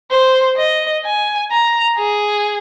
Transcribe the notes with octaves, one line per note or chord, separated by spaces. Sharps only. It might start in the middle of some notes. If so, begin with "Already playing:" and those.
C5
D#5
G#5
A#5
G#4